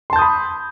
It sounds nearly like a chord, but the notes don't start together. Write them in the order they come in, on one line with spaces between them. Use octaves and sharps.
C6 A5 G6 D#6 B5